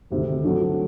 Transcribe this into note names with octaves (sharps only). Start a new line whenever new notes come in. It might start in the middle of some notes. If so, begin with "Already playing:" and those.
D2 C3 D#3
D3 F#3 A3